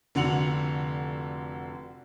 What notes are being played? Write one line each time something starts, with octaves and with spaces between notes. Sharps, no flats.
F1 D3 F#4 C#7 F7 F#7